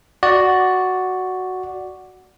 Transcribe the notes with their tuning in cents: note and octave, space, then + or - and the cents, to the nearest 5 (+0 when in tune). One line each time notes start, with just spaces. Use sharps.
F#4 +0 D5 +0